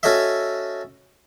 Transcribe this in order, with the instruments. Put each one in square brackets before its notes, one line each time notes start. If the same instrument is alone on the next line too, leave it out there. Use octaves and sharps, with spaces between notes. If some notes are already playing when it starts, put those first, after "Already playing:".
[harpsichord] C#4 F#4 A4 C#5 D#5 E5